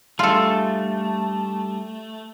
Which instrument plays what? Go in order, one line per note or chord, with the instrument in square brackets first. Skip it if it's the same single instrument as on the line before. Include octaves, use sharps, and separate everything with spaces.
[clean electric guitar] G3 D4 G#4 [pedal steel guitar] A3 [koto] F4 A4